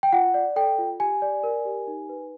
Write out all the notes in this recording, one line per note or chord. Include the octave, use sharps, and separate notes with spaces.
G5
F4 F#5
D5
A4 G5
F4
G4 G#5
D5
A#4
G4
D#4
B4